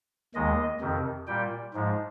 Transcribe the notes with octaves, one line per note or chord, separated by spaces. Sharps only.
D#2 D#3 G#3 D#5
F2 C3 D#3
A#2 G3 G5
G#2 F3 G#3